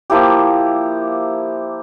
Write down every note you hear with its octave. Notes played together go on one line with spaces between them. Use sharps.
F3 A#3 E4 G4